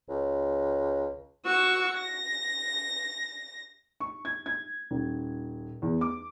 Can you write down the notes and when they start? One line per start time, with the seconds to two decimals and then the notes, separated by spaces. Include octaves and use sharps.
0.09 C#2
1.46 F#4 C#6 E6
1.97 A#6
4.00 C#6
4.25 G#6
4.46 G#6
4.91 D#1
5.82 E2
6.01 D6